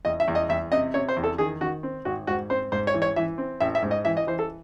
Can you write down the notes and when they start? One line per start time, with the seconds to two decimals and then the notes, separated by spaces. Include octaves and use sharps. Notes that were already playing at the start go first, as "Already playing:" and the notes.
0.05 E2 D#5
0.20 E5
0.28 E2
0.35 D#5
0.49 E2 E5
0.72 C3 D#5
0.94 C3 C#5
1.09 C5
1.17 E2
1.24 A4
1.38 D#3 G#4
1.61 D#3 F#4
1.83 C4
2.05 G#1 F#4
2.27 G#2 F#4
2.50 C4 C5
2.72 G#2 C5
2.87 C#5
2.94 E3
3.02 C#5
3.16 E3 E5
3.38 C4
3.60 A1 E5
3.75 E5
3.82 G#2
3.91 D#5
4.05 E3 E5
4.17 D#5
4.27 E3 C5
4.39 A4